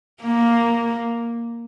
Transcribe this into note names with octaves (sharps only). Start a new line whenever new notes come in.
A#3